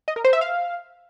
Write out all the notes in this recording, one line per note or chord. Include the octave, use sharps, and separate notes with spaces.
D#5
A#4
C5
E5
F5